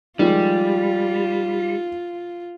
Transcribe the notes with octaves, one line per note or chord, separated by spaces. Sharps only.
D#3 F3 G3 G#3 F4